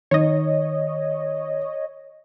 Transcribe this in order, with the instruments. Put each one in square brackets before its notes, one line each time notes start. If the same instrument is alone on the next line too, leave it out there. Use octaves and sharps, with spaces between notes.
[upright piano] D#3 [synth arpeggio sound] C#5 D#5